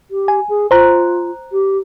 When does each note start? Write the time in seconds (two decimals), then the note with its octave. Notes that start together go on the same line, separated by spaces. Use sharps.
0.10 G4
0.28 G#5
0.49 G#4
0.71 F4 C5 A#5 F#6
1.52 G4